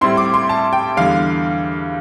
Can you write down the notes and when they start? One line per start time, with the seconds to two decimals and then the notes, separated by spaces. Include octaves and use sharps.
0.01 A2 G3 C4 E4 C6
0.17 D6
0.34 C6
0.49 A5
0.73 G5
0.97 E2 D3 G3 F5